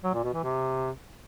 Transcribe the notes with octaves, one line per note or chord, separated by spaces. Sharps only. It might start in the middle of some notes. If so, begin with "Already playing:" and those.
F#3
A#2
B2
E3
C3